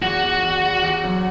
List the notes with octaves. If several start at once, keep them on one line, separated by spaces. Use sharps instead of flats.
E2 F#4
E2
E2
E2
E2
F#3